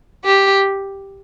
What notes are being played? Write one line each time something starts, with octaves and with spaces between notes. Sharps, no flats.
G4